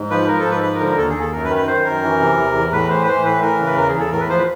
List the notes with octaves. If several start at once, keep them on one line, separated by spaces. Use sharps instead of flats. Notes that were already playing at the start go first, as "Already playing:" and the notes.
Already playing: G#2
F3 B4
F3 A#4
A4
G#2
B4
F3 B4
A#4
D3
A#4
D#2 A4
G#4
D#2
A4
F#2 A#4
B4
D#3
B4
D#3 C5
F#2 A#4
E3
C3
E2
E2
A2 B4
E3 C5
B4
E3 C5
A2 B4
E3 A#4
C#3
B4
E2 A#4
G#4
E2
A4
A2 A#4
B4
F3 C5
B4